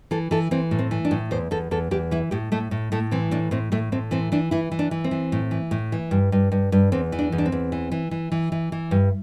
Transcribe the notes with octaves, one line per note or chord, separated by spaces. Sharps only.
E3 A4
E3 A4
E3 C4
A2
C4
E3
D4
A2
E2 C5
E2 A4
E2 A4
E2 G4
E3 E4
A2 G4
A2 A3
A2
A2 A3
E3 C4
A2 D4
A2 C4
A2 A3
A2 C4
E3 C4
E3 D4
E3 E4
E3
D4
E3
C4
E3
A2
E3
A2
E3
G2
G2
G2
G2
E2 C4
E3
D4
E2
D4
C4
E2
E3
E3
E3
E3
E3
E3
G2